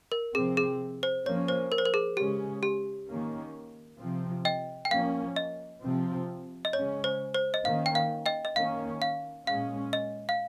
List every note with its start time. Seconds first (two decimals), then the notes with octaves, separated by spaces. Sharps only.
0.12 A#4
0.35 C3 F3 C4 G#4
0.57 G#4
1.03 C5
1.26 F3 A#3 C#4 C#5
1.48 C5
1.72 A#4
1.78 C5
1.85 A#4
1.94 G#4
2.17 C#3 G#3 C#4 G4
2.63 G4
3.08 D#3 A#3 C#4
4.00 C3 F3 C4
4.45 D#5 G5
4.85 G5
4.91 F3 A#3 C#4 F5
5.36 D#5
5.82 C3 F3 C4
6.65 D#5
6.73 C#3 G#3 C#4 C#5
7.04 C5
7.34 C5
7.54 D#5
7.65 D#3 A#3 C#4 F5
7.86 G5
7.95 F5
8.26 D#5 G5
8.45 D#5
8.56 D#3 A#3 C#4 F5
9.02 F5
9.47 A#2 G#3 C#4 F5
9.93 D#5
10.29 F5